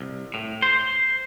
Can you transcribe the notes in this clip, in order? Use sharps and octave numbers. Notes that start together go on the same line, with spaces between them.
C2
A2
C5